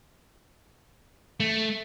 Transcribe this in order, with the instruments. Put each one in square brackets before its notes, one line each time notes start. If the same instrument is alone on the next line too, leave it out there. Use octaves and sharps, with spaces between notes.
[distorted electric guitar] A3